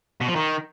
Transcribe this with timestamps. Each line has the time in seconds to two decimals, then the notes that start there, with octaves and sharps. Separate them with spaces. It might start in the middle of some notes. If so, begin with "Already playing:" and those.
0.21 B2
0.28 F3
0.36 D#3